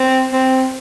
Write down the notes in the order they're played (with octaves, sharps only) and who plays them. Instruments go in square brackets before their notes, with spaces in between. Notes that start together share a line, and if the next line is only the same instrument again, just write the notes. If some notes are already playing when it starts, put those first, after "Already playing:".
Already playing: [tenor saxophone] C4
C4